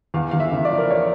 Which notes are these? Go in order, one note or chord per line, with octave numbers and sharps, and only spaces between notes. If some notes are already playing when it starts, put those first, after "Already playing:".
E2 F5
E2 F5
E5
C#3
D5
F3
A#4
C#5